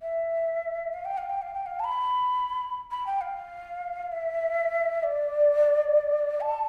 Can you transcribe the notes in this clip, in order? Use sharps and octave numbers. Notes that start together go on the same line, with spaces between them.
E5
F5
G5
F5
G5
F5
G5
F5
A5
B5
B5
G5
F5
E5
D5
A5